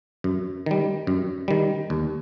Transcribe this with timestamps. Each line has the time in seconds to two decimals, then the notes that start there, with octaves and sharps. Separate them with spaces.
0.24 F#2
0.66 D#3 G3
1.07 F#2
1.48 D#3 G3
1.90 D#2